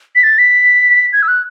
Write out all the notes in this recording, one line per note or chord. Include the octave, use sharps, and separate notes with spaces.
B6
A6
B6
G#6
E6
F#6